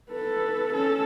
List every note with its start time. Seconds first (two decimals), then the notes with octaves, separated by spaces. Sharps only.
0.11 A4 B4
0.73 C#4 A4